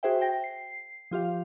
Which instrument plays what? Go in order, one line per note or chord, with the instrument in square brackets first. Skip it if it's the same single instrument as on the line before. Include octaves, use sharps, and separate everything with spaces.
[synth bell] F#4 G#4 C5 E5 G5
G5 A#6
C7
F3 F4 G4 F5